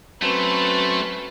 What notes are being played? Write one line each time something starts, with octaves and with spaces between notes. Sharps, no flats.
F#3 A3 C4 C#4 B4